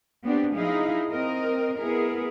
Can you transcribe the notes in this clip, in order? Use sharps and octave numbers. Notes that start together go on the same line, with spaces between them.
B3 C4 D4 F#4 G4
F3 D#4 E4 G#4 F5
C4 A#4 D#5
B3 E4 G#4 A#4